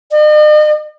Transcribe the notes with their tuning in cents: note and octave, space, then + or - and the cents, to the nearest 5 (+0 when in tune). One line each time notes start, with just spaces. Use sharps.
D#5 -45